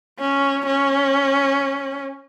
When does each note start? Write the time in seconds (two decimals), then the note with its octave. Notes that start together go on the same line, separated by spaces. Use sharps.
0.20 C#4
0.66 C#4